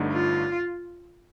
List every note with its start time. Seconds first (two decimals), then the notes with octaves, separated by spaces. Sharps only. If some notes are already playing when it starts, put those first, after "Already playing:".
Already playing: G1 G2 D3 A3 D#4
0.13 F4